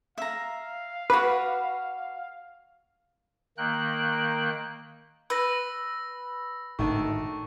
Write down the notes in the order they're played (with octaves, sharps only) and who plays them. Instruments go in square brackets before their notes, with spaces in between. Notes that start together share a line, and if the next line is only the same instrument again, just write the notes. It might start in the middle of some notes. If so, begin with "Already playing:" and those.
[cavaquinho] E5 A#5 [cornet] F5
[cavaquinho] F#4 D6 [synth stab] B4
[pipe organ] D#3 A#3 G5 F#6
[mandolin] B4 [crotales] E6 A#6
[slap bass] G#1 A2 D3 [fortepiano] D#3 A3 D4 [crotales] C#6